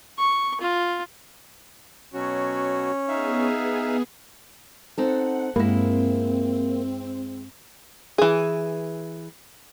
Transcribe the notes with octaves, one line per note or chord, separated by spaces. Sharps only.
C#6
F4
B2 F#3 C#4 F#4
B3 D#4 G#4 E5 F5
C4 D#4 A4 F#5
G2 G#3 A#3 C4 E4 A#4
E3 G#4